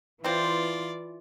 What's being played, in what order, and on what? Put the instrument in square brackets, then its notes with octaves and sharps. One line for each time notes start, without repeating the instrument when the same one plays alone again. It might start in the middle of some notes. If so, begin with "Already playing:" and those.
[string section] E3 [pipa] C4 C5 [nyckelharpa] F4 [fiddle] D5